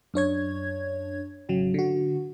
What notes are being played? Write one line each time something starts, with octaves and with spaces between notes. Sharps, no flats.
F#2 D4 C#5 G#6
G#1 C#3 F#3
D3 F#4